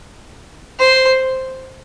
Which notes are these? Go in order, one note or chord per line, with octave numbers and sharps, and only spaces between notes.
C5